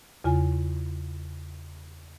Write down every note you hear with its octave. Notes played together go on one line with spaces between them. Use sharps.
E2 C#3 F4 G#5